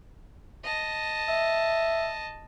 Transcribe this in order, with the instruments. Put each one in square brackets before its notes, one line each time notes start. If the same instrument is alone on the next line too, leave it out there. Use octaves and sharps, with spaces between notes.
[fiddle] D#5 A5
[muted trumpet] E5